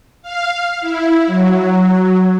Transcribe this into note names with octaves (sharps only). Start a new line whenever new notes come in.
F5
E4
F#3